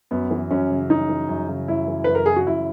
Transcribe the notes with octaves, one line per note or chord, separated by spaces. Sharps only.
F#2 B3
E3
F#2 C#4
C#3
F#2 D#4
E3
F#2
C#3
F#2 E4
E3
F#2 B4
A#4
C#3 G#4
F#4
F#2 E4